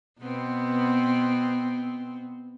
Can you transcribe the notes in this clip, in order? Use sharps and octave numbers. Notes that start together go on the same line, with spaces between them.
B2 B3 C4